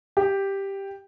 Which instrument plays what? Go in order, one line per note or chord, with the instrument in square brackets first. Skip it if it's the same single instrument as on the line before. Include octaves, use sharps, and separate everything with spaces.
[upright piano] G4